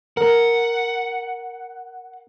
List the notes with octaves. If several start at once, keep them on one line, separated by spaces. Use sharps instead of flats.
A#4 F#5